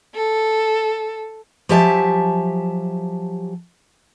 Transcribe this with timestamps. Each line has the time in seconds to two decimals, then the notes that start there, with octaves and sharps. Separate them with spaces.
0.14 A4
1.69 F3 F#3 G4 E5 G#5 A5